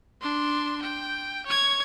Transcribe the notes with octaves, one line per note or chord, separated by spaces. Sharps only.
D4 C6
G5
C#5 G#6